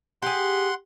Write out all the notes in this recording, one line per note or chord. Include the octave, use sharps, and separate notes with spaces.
G4 G#4 F#5 C6